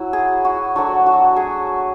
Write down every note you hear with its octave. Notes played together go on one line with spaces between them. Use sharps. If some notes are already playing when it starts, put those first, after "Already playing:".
Already playing: F#3 E4 F#4
G#4
F#4
F#3 A3 D4 F#4
F#4
G#4